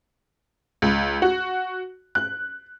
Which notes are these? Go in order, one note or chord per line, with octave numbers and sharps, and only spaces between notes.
C#2
F#4
F#6